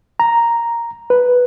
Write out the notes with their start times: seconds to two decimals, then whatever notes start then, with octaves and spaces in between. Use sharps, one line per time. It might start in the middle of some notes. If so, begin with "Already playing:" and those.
0.20 A#5
1.10 B4